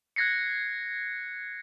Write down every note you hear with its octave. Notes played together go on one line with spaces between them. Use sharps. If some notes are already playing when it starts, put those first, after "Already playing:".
F#6 G#6 A#6 C7 C#7